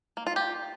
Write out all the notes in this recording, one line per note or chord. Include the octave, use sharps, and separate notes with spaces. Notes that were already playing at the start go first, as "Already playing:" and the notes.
A#3
F4
G4